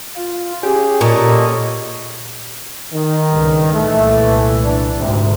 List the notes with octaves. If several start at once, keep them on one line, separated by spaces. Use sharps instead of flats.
F4
C#4 G4 G#4
A#2 A4 C#5 D#5
D#3
C#2 G2
C2 A#2 E3 A3
D4
G#1 D2 C3